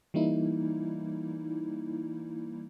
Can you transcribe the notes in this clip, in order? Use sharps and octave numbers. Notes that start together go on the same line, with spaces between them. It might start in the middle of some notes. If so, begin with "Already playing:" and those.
E3 G3 A#3 D#4 E4